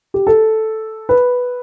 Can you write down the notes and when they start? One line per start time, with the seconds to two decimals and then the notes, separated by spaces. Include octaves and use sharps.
0.14 G4
0.27 A4
1.09 B4